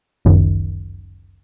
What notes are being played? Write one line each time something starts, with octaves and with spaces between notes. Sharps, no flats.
G1 C#2 F#2 D#3